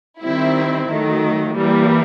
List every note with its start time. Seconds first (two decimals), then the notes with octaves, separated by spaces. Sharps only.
0.20 D#3 G3 C4 E4
0.88 D#3 F#3 A3
1.54 E3 G3 A#3